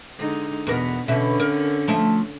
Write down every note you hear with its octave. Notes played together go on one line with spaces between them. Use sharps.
D3 G#3 D#4
E2 B2 B3 A#4
E2 B2 D3 C#4 E5
A#4
F3 A3